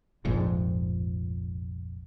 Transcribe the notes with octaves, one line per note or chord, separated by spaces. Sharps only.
F1 A#1 F2 G#2